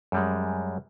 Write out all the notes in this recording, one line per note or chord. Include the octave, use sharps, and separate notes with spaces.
F#2 G3 G#3